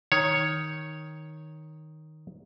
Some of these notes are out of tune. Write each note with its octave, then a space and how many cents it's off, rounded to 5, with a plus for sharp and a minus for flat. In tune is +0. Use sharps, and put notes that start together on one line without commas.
D#3 +0 C#5 +0